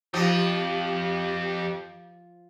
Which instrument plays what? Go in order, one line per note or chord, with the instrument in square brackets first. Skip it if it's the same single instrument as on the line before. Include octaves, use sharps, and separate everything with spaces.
[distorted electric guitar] F2 [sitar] F3 [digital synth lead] G4